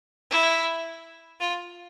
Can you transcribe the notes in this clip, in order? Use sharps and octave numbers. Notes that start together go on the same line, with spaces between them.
E4
F4